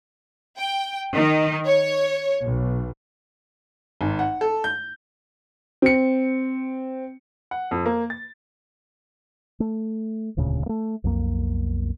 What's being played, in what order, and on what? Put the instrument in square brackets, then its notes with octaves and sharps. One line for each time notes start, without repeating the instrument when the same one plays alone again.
[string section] G5
D#3
C#5
B1
[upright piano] G#1
F#5
A4
G6
[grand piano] C4 C#7
[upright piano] F#5
F2
A#3
A6
[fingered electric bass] A3
E1 D2 A#2 C#3
A3 A#3
B1 F2 A#3